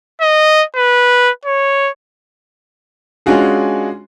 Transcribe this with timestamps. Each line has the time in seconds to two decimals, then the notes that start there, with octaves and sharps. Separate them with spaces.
0.21 D#5
0.76 B4
1.45 C#5
3.26 G#3 C#4 D4 F4 F#4 G#4